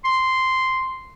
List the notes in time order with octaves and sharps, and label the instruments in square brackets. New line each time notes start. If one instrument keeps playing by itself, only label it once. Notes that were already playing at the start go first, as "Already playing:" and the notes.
[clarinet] C6